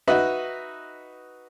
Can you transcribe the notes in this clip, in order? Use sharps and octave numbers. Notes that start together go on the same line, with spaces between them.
D#4 F#4 B4 D#5 E5 F#5